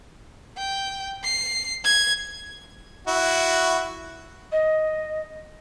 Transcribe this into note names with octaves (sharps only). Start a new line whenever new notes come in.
G5
C7
G#6
E4 F#4
D#5